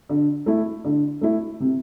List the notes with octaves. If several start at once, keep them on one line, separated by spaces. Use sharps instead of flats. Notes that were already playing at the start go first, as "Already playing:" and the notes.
D3
A3 E4
D3
A3 E4
C3